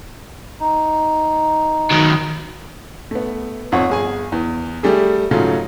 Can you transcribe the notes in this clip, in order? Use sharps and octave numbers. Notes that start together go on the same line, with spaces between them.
D#4
D#3 F#3
A3 B3
G#1 F2 C4 C#5 F#5 C#6
G1 G#4 G#5
E2
G3 A3 G4 G#4
G#2 C#3 F#3 A3 F4